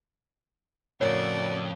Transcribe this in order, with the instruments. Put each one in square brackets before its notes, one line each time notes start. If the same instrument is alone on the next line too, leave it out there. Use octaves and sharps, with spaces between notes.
[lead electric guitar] F2 [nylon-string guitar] A2 C#3 A#4 [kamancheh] F#4 D5 [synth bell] C#5